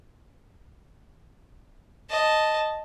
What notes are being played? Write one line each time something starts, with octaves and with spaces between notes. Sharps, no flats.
D#5 A5